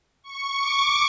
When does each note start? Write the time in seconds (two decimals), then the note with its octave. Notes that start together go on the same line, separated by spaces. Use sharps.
0.23 C#6
0.57 D6